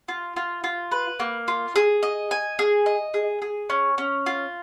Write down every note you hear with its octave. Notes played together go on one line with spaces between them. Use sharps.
F4
F4
F4
B4
A#3
F4
G#4
D#5
G#5
G#4
D#5
G#4
G#4
C#4
C#4
F4